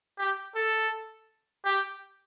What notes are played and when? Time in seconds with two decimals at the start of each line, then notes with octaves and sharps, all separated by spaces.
0.19 G4
0.55 A4
1.65 G4